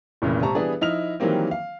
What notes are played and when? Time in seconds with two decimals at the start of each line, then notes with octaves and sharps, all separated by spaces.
0.22 F1 A#2 C#3 E3 A#3
0.42 G#1 C3 A5 A#5 C#6
0.55 E3 G3 B3 D4 G#4
0.81 F3 D#4 E4 F6 F7
1.20 D#3 E3 F#3 G3 A#3 C4
1.51 F5